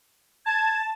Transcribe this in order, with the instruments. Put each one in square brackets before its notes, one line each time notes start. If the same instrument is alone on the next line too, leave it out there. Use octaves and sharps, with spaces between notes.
[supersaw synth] A5 [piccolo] G#6